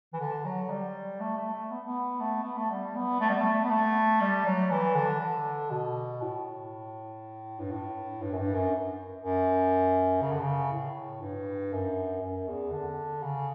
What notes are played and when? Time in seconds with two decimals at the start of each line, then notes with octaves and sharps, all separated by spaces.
0.13 E3
0.20 D3
0.45 F#3
0.70 G3
1.20 A3
1.37 A3
1.53 A3
1.71 B3
1.85 B3
2.20 A3
2.43 B3
2.57 A3
2.70 G3
2.95 B3
3.21 A3
3.29 G3
3.38 A3
3.64 B3
3.71 A3
4.21 G3
4.46 F#3
4.71 E3
4.96 D3
5.20 D3
5.71 B2
6.21 A2
7.60 G2
7.72 A2
8.22 G2
8.33 F#2
8.38 G2
8.54 F#2
9.21 F#2
10.22 C#3
10.32 D3
10.41 C#3
10.72 A2
11.22 G2
11.73 F#2
12.22 F#2
12.48 E2
12.72 D3
13.23 C#3